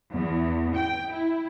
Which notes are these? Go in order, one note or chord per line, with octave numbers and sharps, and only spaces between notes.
E2
G5
E4